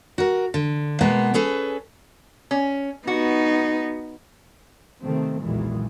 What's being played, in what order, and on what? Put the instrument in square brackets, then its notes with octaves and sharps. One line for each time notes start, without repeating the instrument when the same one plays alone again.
[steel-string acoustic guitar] F#4 A#4
D3
B2 G#3 A#3 B3
C#4 G#4 A4 B4
[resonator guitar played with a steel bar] C#4
[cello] B3 D#4 [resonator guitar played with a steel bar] F#4
[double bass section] C3 D#3 A3 C4
B1 E2 A#2 D#3 E3 G#3